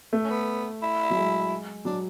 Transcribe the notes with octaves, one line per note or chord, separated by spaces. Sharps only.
A3
C#4
B3
E4
F#3
G#3
F#3 D4